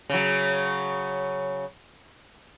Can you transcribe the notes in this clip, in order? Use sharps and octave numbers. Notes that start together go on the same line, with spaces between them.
C#3 F#3